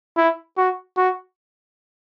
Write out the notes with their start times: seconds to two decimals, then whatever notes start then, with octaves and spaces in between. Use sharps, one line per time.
0.17 E4
0.57 F#4
0.97 F#4